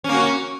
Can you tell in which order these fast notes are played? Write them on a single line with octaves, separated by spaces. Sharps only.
C#4 A#3 F#4